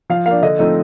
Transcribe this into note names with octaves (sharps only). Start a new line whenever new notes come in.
F3 F5
A#3 D4 F5
D3 D#5
F3 A3 C4 D#4